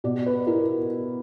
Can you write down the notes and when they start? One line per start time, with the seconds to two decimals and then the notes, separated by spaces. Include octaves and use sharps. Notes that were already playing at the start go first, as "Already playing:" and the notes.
0.04 B2 D5
0.26 B4
0.47 E4 A#4